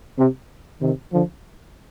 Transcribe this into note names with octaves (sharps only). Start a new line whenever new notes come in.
C3
C3 D#3
D3 F3